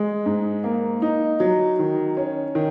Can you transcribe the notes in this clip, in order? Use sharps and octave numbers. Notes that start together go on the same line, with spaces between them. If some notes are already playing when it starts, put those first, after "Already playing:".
Already playing: G#3
G#2
A#3
D#4
F#3
D#3
C#4
D#3